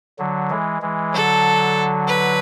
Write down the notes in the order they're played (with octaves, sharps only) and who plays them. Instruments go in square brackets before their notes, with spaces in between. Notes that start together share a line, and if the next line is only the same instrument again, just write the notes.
[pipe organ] D3 F#3
E3 G#3
E3 G#3
[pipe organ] D3 F#3 [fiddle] A4
[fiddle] B4